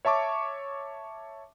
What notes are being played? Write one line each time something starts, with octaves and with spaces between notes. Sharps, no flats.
C#5 E5 A5 C#6 D6